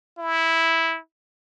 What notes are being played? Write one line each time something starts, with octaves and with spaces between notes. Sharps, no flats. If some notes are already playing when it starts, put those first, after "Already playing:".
E4